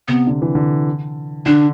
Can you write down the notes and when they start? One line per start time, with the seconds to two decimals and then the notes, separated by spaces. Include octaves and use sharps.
0.08 C3 B3
0.27 D3
0.42 E3
0.55 D3
1.46 D3 D4